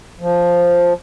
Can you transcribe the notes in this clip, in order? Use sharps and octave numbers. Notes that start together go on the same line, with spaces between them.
F3